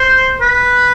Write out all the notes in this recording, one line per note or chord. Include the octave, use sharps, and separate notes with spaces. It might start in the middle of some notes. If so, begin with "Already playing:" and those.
Already playing: C5
B4